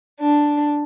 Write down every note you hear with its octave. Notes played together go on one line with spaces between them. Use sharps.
D4